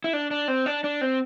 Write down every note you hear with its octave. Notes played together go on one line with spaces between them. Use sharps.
E4
D4
D4
C4
D4
D4
C4